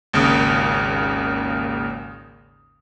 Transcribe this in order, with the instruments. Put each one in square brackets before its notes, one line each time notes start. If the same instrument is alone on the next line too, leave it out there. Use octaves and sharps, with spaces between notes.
[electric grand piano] G#1 D#2 C#3 A#3 D#6